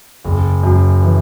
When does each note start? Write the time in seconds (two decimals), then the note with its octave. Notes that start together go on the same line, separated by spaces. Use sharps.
0.24 F#1
0.63 F#2
1.02 E3